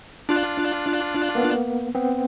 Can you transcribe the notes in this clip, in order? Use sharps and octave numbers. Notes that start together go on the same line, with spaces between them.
D4 F4 F#6
A#3 B3
B3 C4